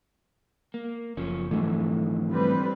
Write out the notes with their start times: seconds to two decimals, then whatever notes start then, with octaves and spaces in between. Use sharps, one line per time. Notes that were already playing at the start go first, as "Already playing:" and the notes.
0.74 A#3
1.17 F#1 F3 C#4
1.51 F2 G#2 D3 E3 F#3 A3
2.31 G3 C4 B4